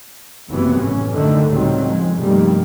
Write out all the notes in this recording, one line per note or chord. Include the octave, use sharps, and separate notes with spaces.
F#1 C3 E3 F#3 B3
A1 C#4
F#2 D3 D#3 A3
C#2 A2 D#3 F#3 G3 C4
F2 G#3
F1 G2 D#3 G3 A#3